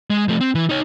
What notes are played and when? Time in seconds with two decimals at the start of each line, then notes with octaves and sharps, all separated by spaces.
0.10 G#3
0.28 F3 A3
0.41 C4
0.55 E3
0.69 D#4 C#5